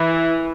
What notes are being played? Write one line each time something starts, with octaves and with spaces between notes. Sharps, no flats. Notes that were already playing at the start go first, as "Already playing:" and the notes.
Already playing: E3